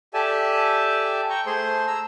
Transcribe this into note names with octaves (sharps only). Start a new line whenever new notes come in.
G4 A4 D5 E5 G#5 A5
G5 A#5 C#6
A3 G#4 C5 C6
A#5 E6